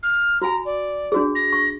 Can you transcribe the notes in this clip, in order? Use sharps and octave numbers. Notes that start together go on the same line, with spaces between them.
F6
F#4 G#5 A#5
D5
D4 F#4 G#4
A#6
C#6